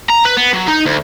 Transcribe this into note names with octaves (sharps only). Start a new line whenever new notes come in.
A#5
B4
B3
F#3
D#4
D2